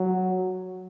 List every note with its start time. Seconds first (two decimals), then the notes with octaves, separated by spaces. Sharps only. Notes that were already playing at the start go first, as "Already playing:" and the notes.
Already playing: F#3